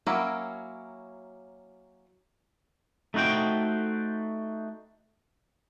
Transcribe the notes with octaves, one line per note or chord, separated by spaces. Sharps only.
F#3 A#3 C#4 E4 A#4
A3 D#4 F#4 C5 G5